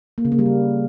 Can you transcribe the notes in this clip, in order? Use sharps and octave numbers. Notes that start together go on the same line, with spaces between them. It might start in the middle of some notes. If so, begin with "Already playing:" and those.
A#3
C#3
A#3
G3
C#3